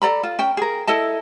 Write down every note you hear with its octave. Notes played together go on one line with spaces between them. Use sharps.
A4 D5 A#5 B5
F4
C#4 G5
G#4 A#4
E4 A4 D#5 A5